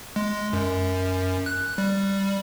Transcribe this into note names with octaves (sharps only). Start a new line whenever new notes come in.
G#3
F#2
F#6
G3